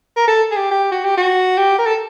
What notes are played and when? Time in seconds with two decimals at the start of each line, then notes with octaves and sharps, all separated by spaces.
0.17 A#4
0.28 A4
0.51 G#4
0.56 G4
0.71 G4
0.92 F#4
1.04 G4
1.17 F#4
1.58 G4
1.79 A#4
1.86 A4